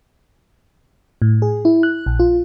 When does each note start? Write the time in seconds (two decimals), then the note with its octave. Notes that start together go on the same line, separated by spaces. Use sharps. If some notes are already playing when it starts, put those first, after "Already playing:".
1.22 A2
1.42 G#4
1.65 E4
1.83 F#6
2.06 A#1
2.20 F4